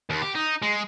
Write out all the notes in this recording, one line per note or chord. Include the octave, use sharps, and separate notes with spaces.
D#2
G4
D#4
G#3